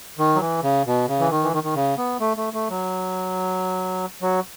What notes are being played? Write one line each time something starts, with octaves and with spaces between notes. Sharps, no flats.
D#3
F#3
E3
C#3
B2
C#3
E3
D#3
E3
D#3
D#3
C#3
B3
A3
A3
A3
F#3
F#3